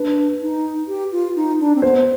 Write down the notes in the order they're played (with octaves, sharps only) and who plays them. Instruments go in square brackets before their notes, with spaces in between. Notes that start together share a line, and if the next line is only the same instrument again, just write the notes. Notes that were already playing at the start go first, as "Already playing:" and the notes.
Already playing: [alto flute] D4 [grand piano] B4
[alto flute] D#4
G4
F4
D#4
D4
C4
[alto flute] B3 [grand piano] C5